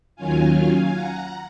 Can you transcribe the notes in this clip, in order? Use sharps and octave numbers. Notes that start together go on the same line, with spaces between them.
D#2 D#3 F#3 C#4 F4 F5 G#5
F#5 A#5